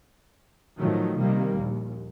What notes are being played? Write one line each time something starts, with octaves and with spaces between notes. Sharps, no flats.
A2 D#3 F3 F#3 A3
C3 D#3 G3 A#3
A#1 D#2